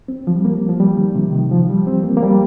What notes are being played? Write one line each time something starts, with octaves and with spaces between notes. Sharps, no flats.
C4
F3
G3
A#3
F3
G3
D#3
C3
D#3
F3
G3
C4
A#3
A#3
G3